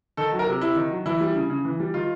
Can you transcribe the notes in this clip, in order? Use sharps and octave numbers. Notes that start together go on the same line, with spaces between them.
D#3 A4
F#3
A#4
C3
C3 E4
D#3
F#3
E3 E4
G3
C#3
C#3
E3
G3
D#3 F4